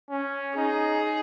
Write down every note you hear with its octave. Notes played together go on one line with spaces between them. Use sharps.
C#4
D#4 G#4